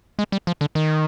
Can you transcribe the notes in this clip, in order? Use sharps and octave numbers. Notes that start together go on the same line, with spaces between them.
G#3
G3
F3
D3
D#3